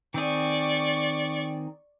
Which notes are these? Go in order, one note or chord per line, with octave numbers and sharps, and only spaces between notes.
D#3 C4 G#4 D5 C#6